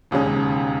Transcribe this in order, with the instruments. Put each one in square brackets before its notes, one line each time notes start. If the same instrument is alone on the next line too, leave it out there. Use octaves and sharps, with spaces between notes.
[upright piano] E1 D#2 C#3 G#3 C#4